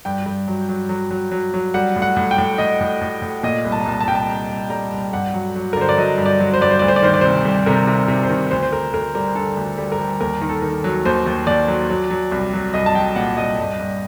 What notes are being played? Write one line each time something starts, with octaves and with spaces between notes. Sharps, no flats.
G2 G5
G2
F#3
F#3
F#3
F#3
F#3
F#3
G3 F#5
A2
F#5
A2
G5
A2
A2 D#5
A2
A2
A2
A#2 D#5
C2
A5
A#5
C2 A5
A5
C2 G5
A5
C2 A#5
C2
G3 A#5
C2
G2 F#5
F#3
F#3
A#4
D3 C5
D5
F#3 D#5
G2
D5
F#3
C5
G2 D5
C5
D2 D5
C5
D5
D#3 C5
D5
C3 C5
G3
C3 A#4
C3
C3
C5
D#3
D2 C5
C5
D2 A#4
D2 A#4
G3 A#4
D3 A4
D2
G3
A#4
G3
D#2 A#4
D#3
A4
D#3
F#3
D#2 C5
D#2
D#2 D5
F#3
F#3
F#3
C2
F#3
C2 D#5
A5
F#3 G5
A#2 F#5
C2 D#5
G2
G2